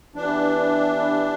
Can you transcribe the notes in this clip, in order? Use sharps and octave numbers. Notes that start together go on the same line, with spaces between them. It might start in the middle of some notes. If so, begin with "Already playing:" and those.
E3 B3 D4 E4 G4